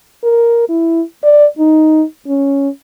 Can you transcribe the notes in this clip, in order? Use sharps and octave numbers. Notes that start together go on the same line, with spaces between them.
A#4
E4
D5
D#4
C#4